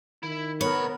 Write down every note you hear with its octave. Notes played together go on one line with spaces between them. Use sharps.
D#3 E4
C2 B3 A#4 C#5 B5